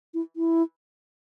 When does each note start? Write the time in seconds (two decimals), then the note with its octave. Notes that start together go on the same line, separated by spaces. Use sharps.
0.14 E4
0.36 E4